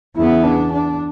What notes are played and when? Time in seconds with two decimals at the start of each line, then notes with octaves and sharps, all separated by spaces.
0.16 E2 C#3 E3 B3 E4
0.44 D4
0.73 D4